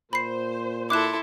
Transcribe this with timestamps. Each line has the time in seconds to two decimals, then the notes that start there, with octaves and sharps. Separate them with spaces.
0.13 A#2 C5 B5 C7
0.90 E4 A4 C6 D6 F#6 E7